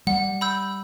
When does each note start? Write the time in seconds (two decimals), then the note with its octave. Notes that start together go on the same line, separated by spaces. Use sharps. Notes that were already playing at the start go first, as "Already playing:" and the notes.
0.07 G3 F#5
0.41 B5 E6 G6